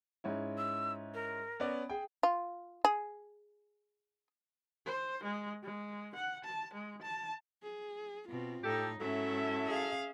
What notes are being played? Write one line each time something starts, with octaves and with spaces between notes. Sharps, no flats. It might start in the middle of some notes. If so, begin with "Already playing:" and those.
G#2 C#4 E4
E6
A#4
B3 C#4 D5
G#4 G5
F4
G#4
C5
G#3
G#3
F#5
A5
G#3
A5
G#4
B2 C4 F4
A2 D#4 G4 A4
G#2 F#3 C#4 E4 A4 E5
G#4 F5